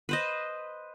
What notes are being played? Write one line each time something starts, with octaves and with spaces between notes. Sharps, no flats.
B4 C5 D#5